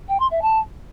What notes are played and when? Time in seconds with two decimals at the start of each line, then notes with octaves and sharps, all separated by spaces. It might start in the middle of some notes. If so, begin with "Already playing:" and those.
0.08 G5
0.19 C6
0.30 E5
0.41 A5